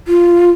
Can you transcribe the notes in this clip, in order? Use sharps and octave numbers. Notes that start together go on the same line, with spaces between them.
F4